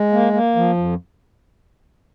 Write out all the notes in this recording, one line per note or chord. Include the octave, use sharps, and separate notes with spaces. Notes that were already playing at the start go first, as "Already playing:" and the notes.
Already playing: G#3
A#3
A#3
F3
F2